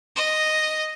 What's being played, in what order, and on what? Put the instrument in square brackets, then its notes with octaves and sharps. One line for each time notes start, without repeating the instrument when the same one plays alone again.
[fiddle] D#5